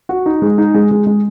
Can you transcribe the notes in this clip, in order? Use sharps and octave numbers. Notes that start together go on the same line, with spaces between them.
F#4
D#4
G#3
D#4
G#3
G#3
G#3